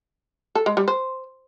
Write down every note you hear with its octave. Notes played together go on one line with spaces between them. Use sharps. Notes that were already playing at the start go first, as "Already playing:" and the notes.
A4
G#3
G3
C5